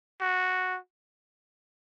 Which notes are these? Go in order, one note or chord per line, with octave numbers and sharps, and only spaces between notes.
F#4